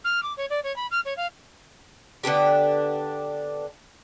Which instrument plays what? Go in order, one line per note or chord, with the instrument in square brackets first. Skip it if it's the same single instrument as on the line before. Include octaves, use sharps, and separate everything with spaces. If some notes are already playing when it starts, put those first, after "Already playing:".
[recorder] F6
D6
C#5
D5
C#5
B5
F6
C#5
F5
[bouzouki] D3 B3 D4 G4